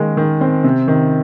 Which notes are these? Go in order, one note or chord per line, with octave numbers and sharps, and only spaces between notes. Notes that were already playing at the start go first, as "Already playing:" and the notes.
Already playing: D#3 G#3 A#3
D#3
C4
C3
D#3